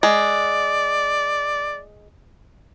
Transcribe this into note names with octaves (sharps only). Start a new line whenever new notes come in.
G#3 D5